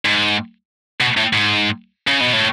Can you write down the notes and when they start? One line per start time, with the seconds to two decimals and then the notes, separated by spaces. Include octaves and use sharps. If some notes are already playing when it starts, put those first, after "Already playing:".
0.05 G#2
1.01 B2
1.17 A2
1.33 G#2
2.08 C#3
2.21 B2
2.33 A2